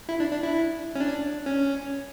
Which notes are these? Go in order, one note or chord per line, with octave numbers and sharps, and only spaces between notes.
E4
D4
D4
E4
C#4
D4
C#4